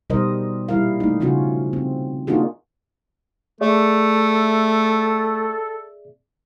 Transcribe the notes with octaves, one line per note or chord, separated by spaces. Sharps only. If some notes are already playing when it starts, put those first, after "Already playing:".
B2 G3 D#4 A#4 C5 D#5
A#2 G3 E4 A#4 F5
A3 D#4
C#3 F3 C#4 F4 F#4
C4
A#3 D4 D#4 F4 F#4 G#4
A3 G#4 A4 D5 E5